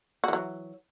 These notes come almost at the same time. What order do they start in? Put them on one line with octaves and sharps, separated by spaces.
F#4 E3 F#3